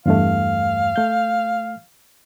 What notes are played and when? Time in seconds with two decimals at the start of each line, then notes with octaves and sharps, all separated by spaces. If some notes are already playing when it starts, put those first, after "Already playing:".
0.06 E2 G2 A3 F5
0.96 A3 G6